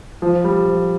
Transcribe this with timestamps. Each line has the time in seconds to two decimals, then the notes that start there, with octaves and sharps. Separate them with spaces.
0.22 F3
0.44 G3
0.68 F3